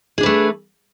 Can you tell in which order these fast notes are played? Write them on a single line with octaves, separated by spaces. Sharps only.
G#4 D4 B4 A3